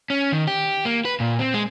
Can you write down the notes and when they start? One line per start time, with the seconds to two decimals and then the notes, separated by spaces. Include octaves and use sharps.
0.10 C#4
0.32 D#3
0.47 G4
0.85 A#3
1.05 B4
1.20 A#2
1.39 C4
1.54 G#3